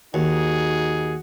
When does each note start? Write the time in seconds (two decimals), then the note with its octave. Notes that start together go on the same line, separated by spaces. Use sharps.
0.14 D#2 D#4 F#4 G#4